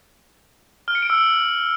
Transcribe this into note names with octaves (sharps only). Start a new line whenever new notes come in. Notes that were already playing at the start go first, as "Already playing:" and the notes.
F6
C#7
D7
E6